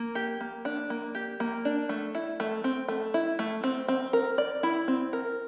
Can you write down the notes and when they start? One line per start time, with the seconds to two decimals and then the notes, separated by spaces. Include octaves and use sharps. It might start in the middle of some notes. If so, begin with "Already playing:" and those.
Already playing: A#3
0.15 G4
0.41 A#3
0.65 D4
0.90 A#3
1.15 G4
1.40 A#3
1.65 D4
1.89 A3
2.15 E4
2.40 A3
2.64 C4
2.88 A3
3.14 E4
3.39 A3
3.64 C4
3.88 C4
4.13 A#4
4.38 D5
4.63 E4
4.88 C4
5.13 A#4